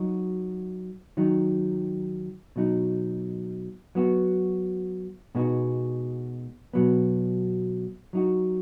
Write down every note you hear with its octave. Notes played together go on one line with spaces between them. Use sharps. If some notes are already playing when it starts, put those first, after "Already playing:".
Already playing: F#3 D#4 F#4
D#3 F#3 D#4
B2 F#3 D#4
F#3 B3 F#4
B2 G#3 B3 D#4 F#4
B2 F#3 B3
F#3 D#4 F#4